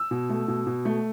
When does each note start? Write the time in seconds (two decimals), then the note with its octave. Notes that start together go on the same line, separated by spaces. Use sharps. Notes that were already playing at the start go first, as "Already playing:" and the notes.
Already playing: E6
0.11 B2
0.29 A3
0.48 B2
0.66 B2
0.85 A3